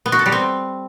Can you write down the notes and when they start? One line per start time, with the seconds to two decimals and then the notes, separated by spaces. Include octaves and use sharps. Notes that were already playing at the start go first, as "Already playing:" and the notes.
0.06 B3
0.12 F#4
0.19 A4
0.26 G3
0.32 C4